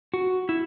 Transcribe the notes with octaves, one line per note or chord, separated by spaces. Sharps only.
F#4
E4